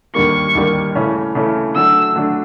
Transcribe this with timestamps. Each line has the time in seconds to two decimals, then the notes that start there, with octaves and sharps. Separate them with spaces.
0.15 D#2 D3 G3 A#3 C#6
0.55 D#2 D3 G3 A#3
0.95 C#3 E3 A3 C#4
1.35 C#3 E3 A3 C#4
1.75 D3 F#3 A3 D4 E6
2.16 D3 F#3 A3 D4